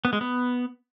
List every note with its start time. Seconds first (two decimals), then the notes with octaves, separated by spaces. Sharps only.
0.05 B3
0.13 G#3
0.21 B3